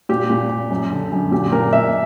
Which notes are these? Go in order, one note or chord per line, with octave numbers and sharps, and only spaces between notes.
A#2 G4
A#2
A#2
F#2
D3
F#2
A#2 G4
A#2 A#4
A#2 E5